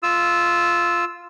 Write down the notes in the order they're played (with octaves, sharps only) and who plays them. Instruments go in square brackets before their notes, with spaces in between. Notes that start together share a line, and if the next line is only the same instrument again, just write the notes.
[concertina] F4 E6